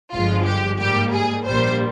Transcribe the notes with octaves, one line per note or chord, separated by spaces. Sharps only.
G1 G2 F3 G#3 F4
G4
G#2 G3 A#3 G4
G#4
A#1 A#2 G3 A#3 C5